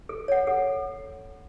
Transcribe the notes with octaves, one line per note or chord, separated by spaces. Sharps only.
A4
C#5 F#5
A4